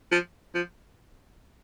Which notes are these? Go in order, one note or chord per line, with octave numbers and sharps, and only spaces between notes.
F3
F3